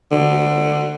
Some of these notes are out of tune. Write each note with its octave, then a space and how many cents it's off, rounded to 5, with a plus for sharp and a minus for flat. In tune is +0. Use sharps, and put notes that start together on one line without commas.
D3 +20